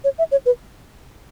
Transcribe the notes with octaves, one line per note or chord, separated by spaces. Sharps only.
C#5
E5
C#5
B4